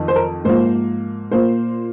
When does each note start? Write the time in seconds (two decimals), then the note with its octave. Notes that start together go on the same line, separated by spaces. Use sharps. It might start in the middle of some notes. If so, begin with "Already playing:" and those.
Already playing: F2 D#3
0.08 C5
0.16 A#4
0.45 G#2 F3 A#3 C5
1.31 A#2 A#3 C5